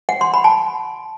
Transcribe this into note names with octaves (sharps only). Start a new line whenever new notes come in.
F#5
C6
B5
A5